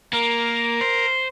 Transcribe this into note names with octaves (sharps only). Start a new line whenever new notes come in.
A#3 A#4
C5